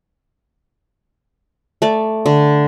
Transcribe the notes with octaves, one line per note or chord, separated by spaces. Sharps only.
A3 D5
D3